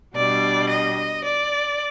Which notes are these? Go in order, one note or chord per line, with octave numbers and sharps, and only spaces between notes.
B2 G3 D4 D5
D#5
D5